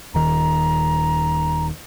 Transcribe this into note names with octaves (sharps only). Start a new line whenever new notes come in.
D#1 D#3 A#5